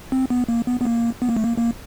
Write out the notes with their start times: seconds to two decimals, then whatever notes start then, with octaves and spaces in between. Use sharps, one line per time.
0.12 C4
0.30 B3
0.48 A#3
0.67 B3
0.81 B3
0.85 A#3
1.22 B3
1.29 A#3
1.37 A3
1.44 A#3
1.58 A#3